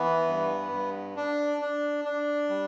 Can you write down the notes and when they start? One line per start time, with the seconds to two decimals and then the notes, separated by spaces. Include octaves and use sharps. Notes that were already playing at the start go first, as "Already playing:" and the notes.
Already playing: E3 B3
0.28 G2
0.72 G2
1.16 D4
1.61 D4
2.05 D4
2.49 G3